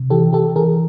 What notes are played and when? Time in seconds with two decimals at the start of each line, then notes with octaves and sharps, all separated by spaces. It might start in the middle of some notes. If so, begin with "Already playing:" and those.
Already playing: C3
0.10 E3 G4 A4
0.33 E3 G4 A4
0.56 E3 G#4 A#4